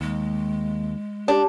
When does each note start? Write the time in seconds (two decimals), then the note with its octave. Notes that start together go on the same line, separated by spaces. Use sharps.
0.01 D#2 G#3
1.28 D4 G4